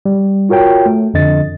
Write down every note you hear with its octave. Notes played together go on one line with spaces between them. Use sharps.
G3
F4 F#4 A#4 C#5 G5
A3
F2 D3 D#5 A6